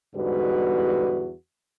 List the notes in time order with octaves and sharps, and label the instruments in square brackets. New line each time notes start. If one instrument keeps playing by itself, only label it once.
[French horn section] E2 G#2 D3 G3 F#4 B4